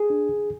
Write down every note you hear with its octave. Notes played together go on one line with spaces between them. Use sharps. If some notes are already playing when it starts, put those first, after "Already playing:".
Already playing: G#4
D4